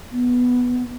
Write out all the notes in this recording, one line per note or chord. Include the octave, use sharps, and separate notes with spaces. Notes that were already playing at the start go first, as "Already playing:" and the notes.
B3